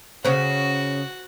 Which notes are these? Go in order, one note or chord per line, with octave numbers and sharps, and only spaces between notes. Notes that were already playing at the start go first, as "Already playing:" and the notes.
C#3 C#4 F#4 C5